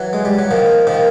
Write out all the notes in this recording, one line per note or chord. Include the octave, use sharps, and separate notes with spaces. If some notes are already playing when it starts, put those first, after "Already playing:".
Already playing: E3 F#3
G#3
G3
F#3
D#3 F3
D#3 F3